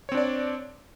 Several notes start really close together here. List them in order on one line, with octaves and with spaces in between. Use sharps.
C#5 C4 D4 D5